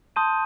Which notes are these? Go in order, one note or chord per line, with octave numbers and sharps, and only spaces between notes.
A5 C6 D#6 G6 D#7